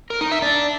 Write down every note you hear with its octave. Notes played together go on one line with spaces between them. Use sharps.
A#4
D#4
E5
D4